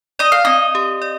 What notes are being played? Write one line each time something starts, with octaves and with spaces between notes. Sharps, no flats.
D5 D#5
F5
C4 D#5
G4
D5